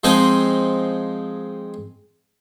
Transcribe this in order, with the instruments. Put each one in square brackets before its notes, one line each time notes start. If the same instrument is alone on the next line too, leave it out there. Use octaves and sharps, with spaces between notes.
[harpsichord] F3 G#3 C4 D#4 G#4 C5